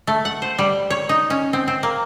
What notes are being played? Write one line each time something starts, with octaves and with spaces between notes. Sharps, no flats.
A3
F#5
C5
G3
C#5
D#4
C#4
C4
C4
A#3